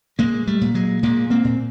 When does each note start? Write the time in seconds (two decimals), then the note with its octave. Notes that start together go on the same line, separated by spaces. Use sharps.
0.19 A#2 G#3 A#3
0.47 G3 A3
0.61 A#2
0.74 F#3 G#3
1.03 A#2 G#3 A#3
1.30 A#3 C4
1.44 A#2